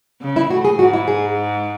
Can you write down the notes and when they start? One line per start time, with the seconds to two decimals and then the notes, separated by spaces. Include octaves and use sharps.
0.21 C#3
0.36 E4
0.50 A2 F#4
0.65 G#4
0.78 G#2 F#4
0.93 E4
1.08 G#4